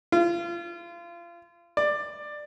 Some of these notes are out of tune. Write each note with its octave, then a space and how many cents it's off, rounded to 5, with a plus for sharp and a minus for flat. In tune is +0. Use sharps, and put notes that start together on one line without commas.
F4 -30
D5 +15